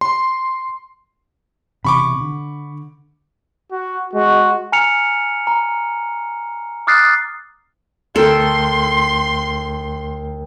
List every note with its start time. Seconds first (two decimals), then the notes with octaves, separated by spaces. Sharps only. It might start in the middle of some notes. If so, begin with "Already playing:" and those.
0.01 C6
1.85 E1 E2 C3 B5 C#6 D6
2.21 D3
3.71 F#4
4.14 G#3 F#4
4.72 G#5 A#5 F6 C#7 F7
5.47 A#5
6.87 D6 D#6 F6 F#6 A6 C7
8.16 D2 A4 A#4 G5 C6